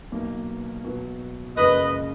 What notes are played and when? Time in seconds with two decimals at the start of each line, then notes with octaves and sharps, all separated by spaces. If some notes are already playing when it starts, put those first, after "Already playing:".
0.12 B1 B2 A#3
0.85 B2 F#3 B3
1.57 F#1 F#2 C#3 F3 G#3 B4 D#5